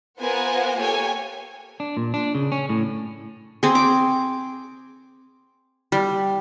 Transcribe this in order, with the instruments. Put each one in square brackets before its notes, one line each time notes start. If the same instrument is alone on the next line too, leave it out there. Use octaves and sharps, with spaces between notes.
[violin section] B3 F4 A#4 C5 F#5 G#5
A#3 G4 A4 C#5 G#5
[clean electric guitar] D4
A#2
D4
C#3
C#4
A2
[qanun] C4 G#4
D6
G3